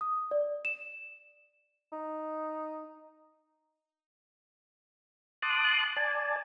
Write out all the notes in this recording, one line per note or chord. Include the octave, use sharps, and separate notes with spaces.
D#6
D5
E7
D#4
A5 C6 D6 D#6 F#6
D5 G#5 A5